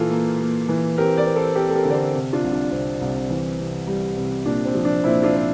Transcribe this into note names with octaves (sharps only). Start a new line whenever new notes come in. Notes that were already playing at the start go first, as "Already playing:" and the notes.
Already playing: A#2 E3 F4 A4
A#3
A#3
E3
C4 G4 A#4
A#4 D5
C4
A4 C5
C4 G4 A#4
A4
G4 A#4
D3 D5
A4 C5
C3
D4 F4
C2
D4
C2 C4
C2
E3
C3
G3
C3
A#2 D4
C4
F3
D4
A#2 C4 E4
D4 F4
C4